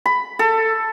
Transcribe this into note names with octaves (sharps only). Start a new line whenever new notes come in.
B5
A4